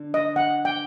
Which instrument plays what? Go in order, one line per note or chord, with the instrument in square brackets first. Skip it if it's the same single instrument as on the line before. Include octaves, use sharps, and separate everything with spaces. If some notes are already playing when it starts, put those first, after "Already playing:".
Already playing: [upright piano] D3
[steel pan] D#5
F#5
G5